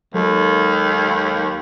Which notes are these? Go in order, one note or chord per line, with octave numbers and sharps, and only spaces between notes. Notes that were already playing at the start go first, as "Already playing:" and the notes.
D#2 F#3 G#3 A4